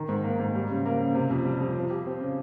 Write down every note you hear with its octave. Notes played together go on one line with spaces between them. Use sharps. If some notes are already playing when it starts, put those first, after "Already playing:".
Already playing: D#3
G#2
A#3
G#2
G3
C#3
A#3
C#3
C3
F2
G3
F2
F3
G4
C4
C#3